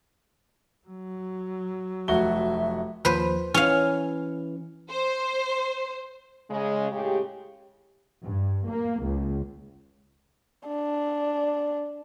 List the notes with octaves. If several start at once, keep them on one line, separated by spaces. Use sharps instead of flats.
F#3
F1 F#4 E5 G7
D#2 F3 B4 C5
E3 C#4 F5
C5
C#3 G#3
A2 C#3 G#3 G4
G2
A#3
C#2
D4